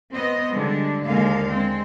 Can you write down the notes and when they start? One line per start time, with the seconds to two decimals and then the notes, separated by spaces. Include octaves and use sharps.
0.12 B3 C4 C5 D#5
0.54 D3 G3 G#3 D4
1.06 D#2 D3 G#3 A#3 F5
1.51 G#3 C4